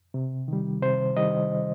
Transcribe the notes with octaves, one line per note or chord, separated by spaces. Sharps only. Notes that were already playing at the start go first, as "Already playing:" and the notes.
C3
D#3 G3
C3 C5
D#3 G3 D#5